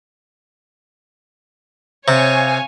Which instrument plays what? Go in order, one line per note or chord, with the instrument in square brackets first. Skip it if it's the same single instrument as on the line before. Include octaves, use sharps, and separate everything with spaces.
[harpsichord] C3 [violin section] C#5 F5 G#5